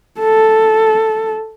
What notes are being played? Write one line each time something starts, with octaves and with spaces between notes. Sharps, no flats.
A4